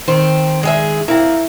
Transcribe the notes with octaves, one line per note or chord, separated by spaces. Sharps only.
D#3 C4
G#3 G#4 E5
A#3 C4 E4